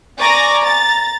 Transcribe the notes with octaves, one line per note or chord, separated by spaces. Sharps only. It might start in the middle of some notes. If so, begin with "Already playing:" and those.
D5 G#5 A#5 C#6 D6 A#6
A#5 A6